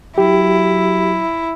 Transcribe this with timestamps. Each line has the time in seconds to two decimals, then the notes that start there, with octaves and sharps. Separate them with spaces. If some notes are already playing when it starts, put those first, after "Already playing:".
0.18 F#3 E4 G4